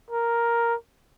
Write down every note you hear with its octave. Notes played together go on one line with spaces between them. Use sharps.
A#4